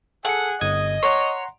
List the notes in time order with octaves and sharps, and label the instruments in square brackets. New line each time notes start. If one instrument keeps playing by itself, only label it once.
[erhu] G#4 [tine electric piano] A4 C#7 [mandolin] F#5
[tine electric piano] G1 D#6 G#6 [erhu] D#5
[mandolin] C#5 [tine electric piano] F#5 A#5 C6